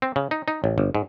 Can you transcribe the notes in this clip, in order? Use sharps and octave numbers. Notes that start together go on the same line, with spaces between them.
C4
C#3
D#4
D#4
A1
G1
G#2